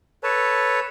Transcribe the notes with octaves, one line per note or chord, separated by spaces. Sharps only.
A4 B4 C#5 A5